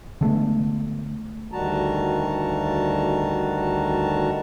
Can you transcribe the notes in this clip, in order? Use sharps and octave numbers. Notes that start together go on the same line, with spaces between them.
D3 G#3 A3 B3
D2 D#3 G3 F#4 A5 A#5